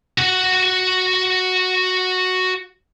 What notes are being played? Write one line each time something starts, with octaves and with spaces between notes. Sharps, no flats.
F#4 F#5